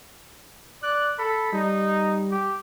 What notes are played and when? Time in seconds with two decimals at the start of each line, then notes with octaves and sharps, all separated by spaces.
0.83 D5 F#6
1.18 A4 B5
1.52 G3 D#4
2.31 G4